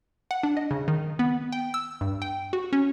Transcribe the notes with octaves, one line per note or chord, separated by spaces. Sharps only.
F#5
D4
D#5
C#3
D#3
B3
G5
E6
G2
G5
F#4
C#4